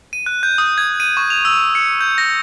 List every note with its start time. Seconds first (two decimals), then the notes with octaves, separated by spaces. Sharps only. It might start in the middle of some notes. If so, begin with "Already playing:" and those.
0.13 D#7
0.26 F#6
0.43 G6
0.58 D#6
0.78 G#6
1.00 D#7
1.17 C#6
1.30 F7
1.45 E6
1.75 C#7
2.01 G6
2.18 A#6